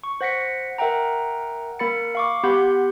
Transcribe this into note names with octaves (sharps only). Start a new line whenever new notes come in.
C#6
C5 F#5 A#6 B6 C#7
A#4 E5 F#5 G5 A#5
A#3 A#4 B5 A6 C#7
F5 C#6 D6
B3 G4 F#5 B5 C6 G6